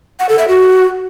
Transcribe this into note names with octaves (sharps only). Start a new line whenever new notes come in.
F#5
A4
E5
F#4